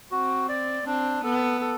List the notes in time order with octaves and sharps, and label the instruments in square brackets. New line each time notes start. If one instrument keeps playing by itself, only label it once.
[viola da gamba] C4 [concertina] F#4
[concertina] D5
[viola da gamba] C4 [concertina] D4
[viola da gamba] B3 [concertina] A4
[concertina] A4